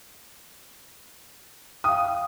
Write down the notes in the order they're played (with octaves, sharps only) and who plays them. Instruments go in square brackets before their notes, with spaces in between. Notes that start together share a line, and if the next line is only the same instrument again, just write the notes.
[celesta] F5 G5 [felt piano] D#6